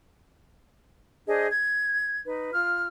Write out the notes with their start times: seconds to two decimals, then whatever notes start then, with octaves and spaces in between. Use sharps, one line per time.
1.26 D4 G#4 C5 D#5
1.50 G#6
2.24 D#4 B4
2.52 F4 F6